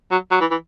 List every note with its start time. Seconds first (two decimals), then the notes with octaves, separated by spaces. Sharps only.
0.11 F#3
0.31 F#3
0.41 E3
0.51 E3